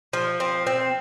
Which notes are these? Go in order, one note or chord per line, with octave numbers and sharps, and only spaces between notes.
F3
C4
C4